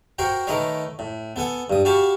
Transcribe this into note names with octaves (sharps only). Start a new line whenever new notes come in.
F#4 A#4 C5 F#5 G5
D#3 A3 A#4 B4 C#5 D#5
A2
B3 A4 F#5 G#5
G2 D#6
F#4 G4 F5 A5 B5 C#6